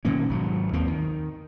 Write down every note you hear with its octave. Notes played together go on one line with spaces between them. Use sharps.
B2 D#3 A#3 C#4
G#1 F#3
D#2 A#3 C4
D#3